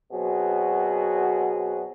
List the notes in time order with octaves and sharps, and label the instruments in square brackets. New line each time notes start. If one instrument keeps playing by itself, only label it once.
[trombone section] B2 F#3 C4 F#4 G#4